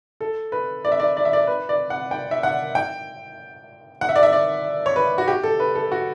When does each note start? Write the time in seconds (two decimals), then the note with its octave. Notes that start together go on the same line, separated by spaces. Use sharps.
0.21 A4
0.52 B4
0.85 D5
0.92 E5
1.00 D5
1.17 D5
1.25 E5
1.33 D5
1.47 B4
1.69 D5
1.90 F#5
2.11 G5
2.31 E5
2.43 F#5
2.75 G5
4.01 F#5
4.09 E5
4.16 D5
4.23 E5
4.33 D5
4.86 C#5
4.96 B4
5.18 F#4
5.28 G4
5.43 A4
5.60 B4
5.75 A4
5.92 F#4